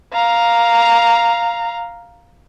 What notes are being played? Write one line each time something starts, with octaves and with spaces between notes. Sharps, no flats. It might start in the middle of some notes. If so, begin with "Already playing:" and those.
F5 A#5